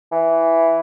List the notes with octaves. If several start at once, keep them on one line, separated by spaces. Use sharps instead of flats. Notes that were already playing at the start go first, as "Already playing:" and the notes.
E3